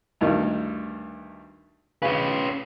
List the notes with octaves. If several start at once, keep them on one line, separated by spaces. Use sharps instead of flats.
D2 G2 D#3
C#3 C#4 B4